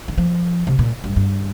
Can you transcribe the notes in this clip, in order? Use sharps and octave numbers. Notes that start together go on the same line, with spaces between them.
D#3
F3
C3
A#2
G2
G2